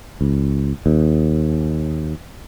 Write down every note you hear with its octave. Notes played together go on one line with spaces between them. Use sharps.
C#2
D#2